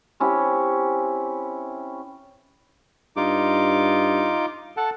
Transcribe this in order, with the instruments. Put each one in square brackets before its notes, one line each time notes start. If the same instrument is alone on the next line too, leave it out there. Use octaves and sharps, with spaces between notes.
[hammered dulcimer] C4 C#4 E4 G4
[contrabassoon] G2 [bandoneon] D#4 F4 D6
[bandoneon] A4 F#5 A5